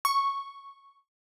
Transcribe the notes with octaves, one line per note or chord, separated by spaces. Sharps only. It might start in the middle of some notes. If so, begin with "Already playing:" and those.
C#6